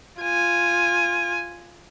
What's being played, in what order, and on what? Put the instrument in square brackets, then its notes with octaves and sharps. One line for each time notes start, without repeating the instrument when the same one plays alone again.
[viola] F4 G#5